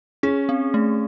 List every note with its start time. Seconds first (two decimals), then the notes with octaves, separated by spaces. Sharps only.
0.23 C#4 G#4
0.49 C4
0.74 A3